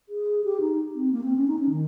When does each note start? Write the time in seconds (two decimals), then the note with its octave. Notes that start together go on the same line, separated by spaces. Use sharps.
0.09 G#4
0.44 G4
0.61 D#4
0.95 C4
1.12 A#3
1.24 C4
1.36 C#4
1.48 D#4
1.59 C#4
1.70 D#3